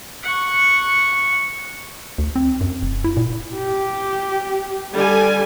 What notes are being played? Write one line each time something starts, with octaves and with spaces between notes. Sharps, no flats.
F#5 C#6
D2
C4
F#2
F1
E4
A#2
G4
D3 G3 G#5